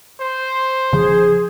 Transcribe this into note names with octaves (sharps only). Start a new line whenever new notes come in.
C5
E1 C#3 F3 G#4